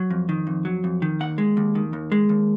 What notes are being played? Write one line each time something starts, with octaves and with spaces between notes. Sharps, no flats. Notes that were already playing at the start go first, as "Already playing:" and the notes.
Already playing: F#3
F2
D#3
F2
F#3
F2
D#3
D#2 F#5
G#3
D#2
D#3
D#2
G#3
D#2